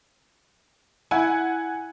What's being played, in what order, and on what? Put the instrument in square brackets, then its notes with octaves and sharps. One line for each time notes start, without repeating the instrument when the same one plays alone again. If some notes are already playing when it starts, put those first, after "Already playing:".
[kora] E4 [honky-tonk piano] F#5 G#5